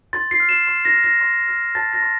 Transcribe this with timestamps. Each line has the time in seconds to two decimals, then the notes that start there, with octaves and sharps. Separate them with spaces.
0.13 C6 A6
0.31 C7
0.40 F6
0.49 E7
0.67 C6
0.85 A#6
0.94 F6
1.04 A#6
1.21 C6
1.48 F6
1.75 A5 A6
1.93 A#6
2.02 C6